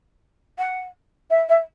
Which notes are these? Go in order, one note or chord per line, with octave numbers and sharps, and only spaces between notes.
F#5
E5
E5